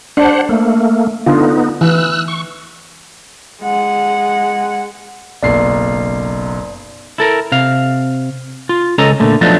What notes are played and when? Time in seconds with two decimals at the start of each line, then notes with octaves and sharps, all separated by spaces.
0.17 D4 C5 F#5
0.49 A3 A#3
1.26 D3 B3 D#4 F4
1.81 E3 E6 F#6
2.28 C#6
3.63 G#3 F#5
5.43 F#1 B1 D5 C7
7.18 E4 A4 A#4
7.52 C3 F5
8.69 F4
8.98 C#2 C#4 A4 D#5 A#5
9.20 A#2 D3 A3
9.41 F3 F#3 A3 B3 D4 D#4